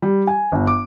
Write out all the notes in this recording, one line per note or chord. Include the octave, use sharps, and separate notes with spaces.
G3
G#5
G1
D6